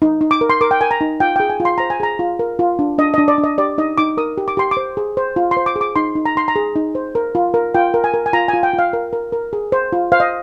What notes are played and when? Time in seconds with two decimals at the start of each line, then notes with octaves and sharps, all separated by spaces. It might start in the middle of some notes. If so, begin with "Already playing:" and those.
0.02 D#4
0.21 D#4
0.31 D6
0.41 A#4
0.50 C6
0.61 A#4 D6
0.71 G5
0.81 A#4 G#5
0.91 A#5
1.01 D#4
1.20 F4 G5
1.36 G5
1.40 G#4
1.50 G#5
1.60 F4
1.65 C6
1.78 C5 A#5
1.90 G#5
2.00 G#4 A#5
2.19 F4
2.39 A#4
2.59 F4
2.79 D4
2.98 D4 D#5
3.14 D#5
3.18 D4
3.28 D5
3.38 D4
3.44 D#5
3.58 G4 D5
3.78 D#4 D#5
3.98 D#4 D6
4.17 A#4 D#6
4.38 G4
4.48 D6
4.57 G4 C6
4.71 D6
4.77 C5
4.97 G#4
5.17 C5
5.36 F4
5.51 C6
5.57 C5
5.66 D6
5.76 G#4
5.81 D6
5.96 D#4 C6
6.16 D#4
6.26 A#5
6.36 D#4 C6
6.48 A#5
6.56 G#4
6.76 D#4
6.95 C5
7.15 A#4
7.35 F4
7.54 A#4
7.74 F4 G5
7.94 A#4
8.04 G#5
8.14 A#4
8.26 G#5
8.33 F4 A#5
8.48 G#5
8.54 F4
8.63 G5
8.74 F4 F5
8.93 A#4
9.13 A#4
9.32 A#4
9.53 G#4
9.72 C5
9.93 F4
10.12 C5 F5
10.20 D#5